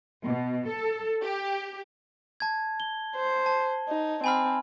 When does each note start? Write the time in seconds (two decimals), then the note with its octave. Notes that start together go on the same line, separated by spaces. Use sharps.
0.24 B2
0.67 A4
1.23 G4
2.40 A5 G#6
2.80 G7
3.16 C5
3.46 A5
3.89 D#4
4.24 C4 G#5 B5 F6